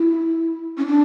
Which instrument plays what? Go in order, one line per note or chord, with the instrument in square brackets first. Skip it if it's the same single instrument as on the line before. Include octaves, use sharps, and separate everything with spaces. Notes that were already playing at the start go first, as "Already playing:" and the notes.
Already playing: [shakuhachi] E4
C#4
D4